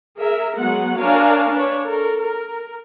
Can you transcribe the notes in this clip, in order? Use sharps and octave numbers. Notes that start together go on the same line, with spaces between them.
G#4 A#4 E5
F#3 G#3 B3 F#5
D4 A#4 C#5 F5 G#5
D4 B4 C#5
A4 A#4
A#4